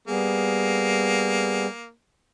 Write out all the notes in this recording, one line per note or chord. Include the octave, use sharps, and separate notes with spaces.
G3 A#3 B3 G#4